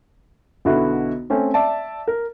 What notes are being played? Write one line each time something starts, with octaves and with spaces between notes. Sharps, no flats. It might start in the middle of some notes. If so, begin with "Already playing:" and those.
B1 D3 B3 E4 F#4
A3 C4 C#4
D5 E5 A5
A#4